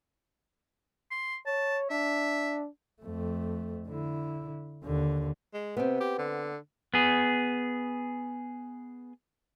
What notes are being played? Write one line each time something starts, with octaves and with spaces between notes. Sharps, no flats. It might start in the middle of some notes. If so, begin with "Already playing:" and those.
C6
C#5 A5
D4 E5
F2 A3
D3 E4
D#2 D3
G#3
C3 B3 C4
G4
D3
B3 G#4